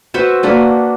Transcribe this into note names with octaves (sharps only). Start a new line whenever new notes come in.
F#4 B4 C5 E5
A#3 D4 F#4 B4